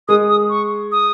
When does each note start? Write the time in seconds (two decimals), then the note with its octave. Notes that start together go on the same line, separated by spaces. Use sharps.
0.08 G#3 D#6
0.29 D#6
0.49 C#6
0.92 D#6